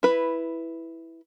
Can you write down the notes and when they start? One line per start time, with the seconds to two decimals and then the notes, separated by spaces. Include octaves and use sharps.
0.03 E4 B4